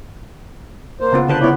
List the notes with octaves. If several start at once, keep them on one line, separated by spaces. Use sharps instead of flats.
A#3 C5
C#3 B3 F4
D3 B4 C5 A5
C#3 B3 E4 C#5 D5